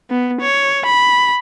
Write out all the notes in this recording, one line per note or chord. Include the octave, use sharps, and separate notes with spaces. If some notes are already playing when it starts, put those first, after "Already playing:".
B3
C#5
B5